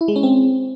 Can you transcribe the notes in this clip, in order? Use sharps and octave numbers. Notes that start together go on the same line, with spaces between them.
E4
G#3
C#4
C4